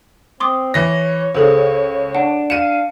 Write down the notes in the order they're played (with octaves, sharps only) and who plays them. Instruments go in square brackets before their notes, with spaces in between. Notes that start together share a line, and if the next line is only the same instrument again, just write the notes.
[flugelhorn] C4 [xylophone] C6 D6 D#6
[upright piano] E3 A#6 [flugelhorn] C#5
[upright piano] C#2 [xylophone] G#4 A4 C5
[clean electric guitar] D4 [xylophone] F#5
[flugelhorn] F5 [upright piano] C#7 D#7 [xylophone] E7